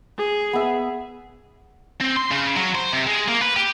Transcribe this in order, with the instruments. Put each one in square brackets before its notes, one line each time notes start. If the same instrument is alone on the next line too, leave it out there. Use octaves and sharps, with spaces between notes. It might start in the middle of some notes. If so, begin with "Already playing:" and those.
[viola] G#4
[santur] B3 E5
[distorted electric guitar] C4
C6
C#3
F#3
C5
C3
G#3
A#3
B4
G4